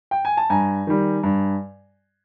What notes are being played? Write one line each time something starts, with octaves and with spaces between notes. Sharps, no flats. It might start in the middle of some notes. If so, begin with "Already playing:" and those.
G5
G#5
A5
G2 G#5 A#5
D#3 G3
G2